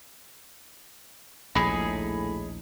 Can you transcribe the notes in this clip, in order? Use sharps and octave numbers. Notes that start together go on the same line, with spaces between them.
A#1 D#2 A2 D#4 G#4 B5